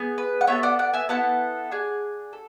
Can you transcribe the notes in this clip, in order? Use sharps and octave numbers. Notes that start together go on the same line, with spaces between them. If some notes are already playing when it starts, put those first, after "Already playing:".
Already playing: B3 G#4
B4
F#5
B3 E4 A4 C#5 E5
D5 F#5
D5 F#5
E5 G#5
B3 E4 A4 F#5 A5
D4 G#4
A4